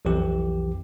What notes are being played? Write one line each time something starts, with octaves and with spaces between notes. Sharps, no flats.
B1 F2 E3 G4